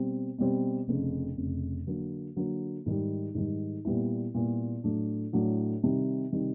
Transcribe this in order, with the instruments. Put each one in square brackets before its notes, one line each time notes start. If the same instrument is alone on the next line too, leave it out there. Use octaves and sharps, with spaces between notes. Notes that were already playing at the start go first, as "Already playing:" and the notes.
Already playing: [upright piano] B2 G3 C4
B2 G3 C4
F1 F2 C#3
F1 F2 C#3
D3 F#3 A#3
D3 F#3 A#3
G#2 D#3 G3
G#2 D#3 G3
A#2 G3 B3 E4
A#2 G3 B3 E4
A2 F#3 A3 D4
A2 F#3 A3 D4
C3 D#3 G3
C3 D#3 G3